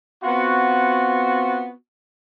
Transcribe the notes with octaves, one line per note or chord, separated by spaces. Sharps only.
B3 C4 F4 F#4